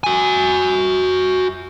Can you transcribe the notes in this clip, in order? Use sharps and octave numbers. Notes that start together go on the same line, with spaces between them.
F#4 G#5